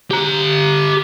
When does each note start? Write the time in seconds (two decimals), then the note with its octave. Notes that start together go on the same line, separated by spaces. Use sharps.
0.10 G4 A#5